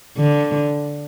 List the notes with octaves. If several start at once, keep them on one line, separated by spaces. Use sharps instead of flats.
D3